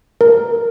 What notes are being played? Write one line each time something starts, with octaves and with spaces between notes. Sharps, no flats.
A#4